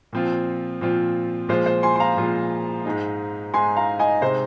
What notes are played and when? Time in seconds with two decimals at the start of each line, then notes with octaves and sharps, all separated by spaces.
0.13 A#2 F3 C4 F4
0.81 A#2 F3 C4 F4
1.49 A#2 F3 G#3 F4 C5
1.66 C5
1.83 G#5 C6
1.96 C6
2.00 F5 A#5
2.17 A#2 F3 G#3 F4
2.85 G#2 G#3 D#4
3.54 G#2 G#3 D#4 G#5 C6
3.76 F5 A#5
3.99 D#5 G#5
4.21 C3 G#3 D#4 C5